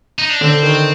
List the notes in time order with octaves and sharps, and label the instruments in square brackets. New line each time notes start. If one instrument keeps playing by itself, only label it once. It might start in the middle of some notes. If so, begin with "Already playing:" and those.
[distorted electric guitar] D#4
D4
[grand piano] D3 [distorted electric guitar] C4
[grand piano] D#3